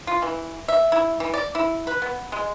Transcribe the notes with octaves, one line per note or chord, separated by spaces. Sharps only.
F4
E3
E5
E4
E3
D5
E4
B4
B3
G#3